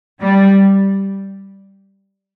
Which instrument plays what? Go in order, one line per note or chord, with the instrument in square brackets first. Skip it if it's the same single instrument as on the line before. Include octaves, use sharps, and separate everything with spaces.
[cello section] G3